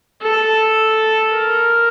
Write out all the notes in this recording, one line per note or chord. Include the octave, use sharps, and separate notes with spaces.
A4
A#4